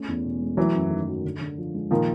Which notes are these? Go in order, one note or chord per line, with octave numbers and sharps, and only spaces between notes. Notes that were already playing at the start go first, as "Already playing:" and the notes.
Already playing: A3 C#4
E2
B2
G#3
E3 F#3 A3
F#2
D#3
F#3
D3
D3
F3
G#3
A#2 D#3 F3